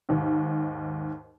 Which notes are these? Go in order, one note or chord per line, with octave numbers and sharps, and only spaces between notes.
D#2 G#2